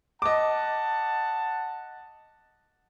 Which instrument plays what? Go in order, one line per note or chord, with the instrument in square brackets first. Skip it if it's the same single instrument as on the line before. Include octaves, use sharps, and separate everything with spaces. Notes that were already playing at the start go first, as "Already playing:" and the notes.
[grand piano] D#5 D6 [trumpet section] F#5 A5